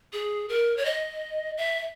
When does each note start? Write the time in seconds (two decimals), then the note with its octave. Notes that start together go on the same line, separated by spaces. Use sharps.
0.13 G#4
0.49 A#4
0.77 C#5
0.85 D#5
1.57 E5